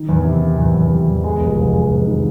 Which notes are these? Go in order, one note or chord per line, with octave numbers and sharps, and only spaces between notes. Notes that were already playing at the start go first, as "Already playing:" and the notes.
Already playing: D#3
E2
C3
C3
E2
E2
G3
E2
G#3
F1
F1
G#3
F1
D#3